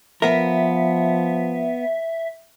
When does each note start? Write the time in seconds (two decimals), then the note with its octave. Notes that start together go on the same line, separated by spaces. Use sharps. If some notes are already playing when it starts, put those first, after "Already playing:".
0.22 F3 B3 A#4 E5